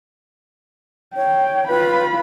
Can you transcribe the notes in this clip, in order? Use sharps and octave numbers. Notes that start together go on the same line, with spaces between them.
C#5 G5
F4 B4 B5